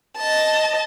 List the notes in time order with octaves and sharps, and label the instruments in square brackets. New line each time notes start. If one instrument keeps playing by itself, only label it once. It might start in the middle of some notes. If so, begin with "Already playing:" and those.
[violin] D#5 A5